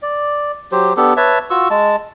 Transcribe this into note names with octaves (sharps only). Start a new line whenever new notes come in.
D5
F#3 G4 C5
B3 D4 G4 A4
B4 C#5 E5 A5
F4 F#4 C#6 E6
G#3 A5